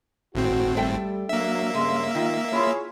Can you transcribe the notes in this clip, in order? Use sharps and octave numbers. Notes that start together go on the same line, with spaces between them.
G#1 A2 C4 F#4
G3 A3 A4 G5
F#3 A#3 D4 E5
G2 C#3 G#3
D#3 D#4 F4
E4 F4 G#4 C#5